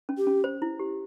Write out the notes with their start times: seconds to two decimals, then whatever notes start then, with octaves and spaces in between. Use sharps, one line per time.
0.09 C#4
0.18 G4
0.27 C#4
0.44 C5
0.62 E4
0.79 G4